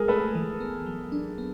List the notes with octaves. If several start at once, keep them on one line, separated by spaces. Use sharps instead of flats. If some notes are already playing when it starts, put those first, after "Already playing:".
Already playing: G#3 G#4 A#4
A3 A4 B4
E3
B3
F#3
D4
B3